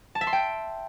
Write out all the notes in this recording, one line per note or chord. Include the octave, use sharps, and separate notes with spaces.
A5
E5
C6
G5